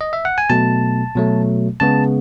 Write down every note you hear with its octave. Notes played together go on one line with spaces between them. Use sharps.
D#5
E5
F#5
G#5
B2 F#3 A3 A5
B2 F#3 A3
C#3 G#3 B3 A5